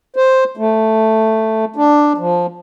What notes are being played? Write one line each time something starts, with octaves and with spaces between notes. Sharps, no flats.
C5
A3
D4
F3